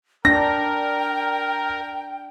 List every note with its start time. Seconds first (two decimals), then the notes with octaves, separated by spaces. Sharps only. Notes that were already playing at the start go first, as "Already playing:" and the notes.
0.25 D4 A#4 G5 A#6